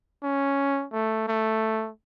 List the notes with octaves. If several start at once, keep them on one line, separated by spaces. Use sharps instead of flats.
C#4
A3
A3